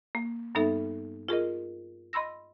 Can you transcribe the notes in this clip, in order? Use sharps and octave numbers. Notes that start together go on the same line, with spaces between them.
A#3
G2 G3 B3 D#4 A4 E5
F4 G#4 A#4 D#5
D#5 B5 C6 E6 A#6